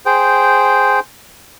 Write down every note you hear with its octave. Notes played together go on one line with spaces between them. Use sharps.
G#4 C5 G5